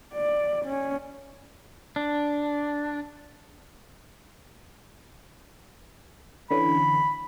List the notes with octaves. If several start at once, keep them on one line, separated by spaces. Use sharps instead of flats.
D5
C#4
D4
D3 E3 C#4 B5